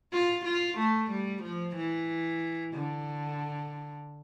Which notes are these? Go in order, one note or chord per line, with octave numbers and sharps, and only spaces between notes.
F4
F4
A3
G3
F3
E3
D3